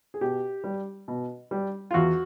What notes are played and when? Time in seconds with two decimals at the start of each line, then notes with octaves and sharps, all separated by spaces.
0.14 G#4
0.21 B2 G4
0.64 G3
1.08 B2
1.51 G3
1.91 F4
1.94 E2 F#4